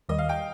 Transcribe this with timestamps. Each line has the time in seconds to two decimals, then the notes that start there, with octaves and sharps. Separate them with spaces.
0.09 D#2 D#3 G3 D#5
0.18 F5
0.29 G5